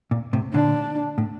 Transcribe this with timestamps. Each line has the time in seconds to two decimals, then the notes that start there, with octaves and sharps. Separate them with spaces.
0.11 A#2
0.33 A2 C3
0.54 A#2 D3 D4
1.18 A2